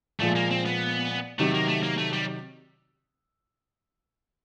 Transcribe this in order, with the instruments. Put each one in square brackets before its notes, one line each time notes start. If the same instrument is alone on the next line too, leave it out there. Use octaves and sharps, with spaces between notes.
[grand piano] A#2 F3 G#3 [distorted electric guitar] A3
[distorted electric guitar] A#3
C4
B3
[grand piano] C3 D#3 F#3 [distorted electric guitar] A3
[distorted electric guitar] A#3
A3
A#3
A3
G3